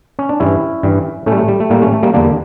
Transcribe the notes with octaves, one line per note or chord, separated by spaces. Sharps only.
C#4
D4
G2 E3 G3 C#4 E4
G2 E3 G3
A2 A3 C#4
G3
A3
G3
A3
A2 G3 A#3
A3 C#4
A3
G3 A#3
E2 D3 G3 A#3 D4